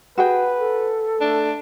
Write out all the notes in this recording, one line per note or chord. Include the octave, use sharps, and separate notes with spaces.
F#4 G#4 B4 G5
A4
A3 D4